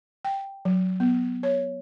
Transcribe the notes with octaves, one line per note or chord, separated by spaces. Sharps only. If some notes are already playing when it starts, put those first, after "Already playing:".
G5
F#3
B3
C#5